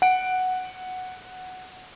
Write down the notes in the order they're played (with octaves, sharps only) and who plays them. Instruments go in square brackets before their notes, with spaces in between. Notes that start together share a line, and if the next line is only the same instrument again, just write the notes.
[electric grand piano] F#5 D7